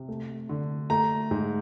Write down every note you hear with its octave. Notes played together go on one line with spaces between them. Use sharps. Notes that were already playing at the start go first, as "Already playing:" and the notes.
Already playing: C3
A3
D3
A3 A#5
G#2